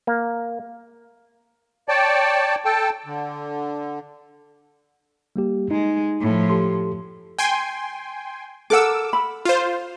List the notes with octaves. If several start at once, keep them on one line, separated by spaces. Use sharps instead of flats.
A#3
C#5 D5 G5 A5
A4 G5 A5
D3
G3 A#3 G4
G#3 D#4
A2 F3
G4 A4 C6
G5 G#5 C6
A4 A#4 F#5 D6 E6
B5
F4 C5